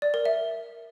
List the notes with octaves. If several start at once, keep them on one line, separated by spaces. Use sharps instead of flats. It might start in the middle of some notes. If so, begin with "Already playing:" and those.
D5
A#4
E5